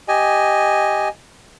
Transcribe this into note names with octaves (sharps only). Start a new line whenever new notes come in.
G4 D#5 G#5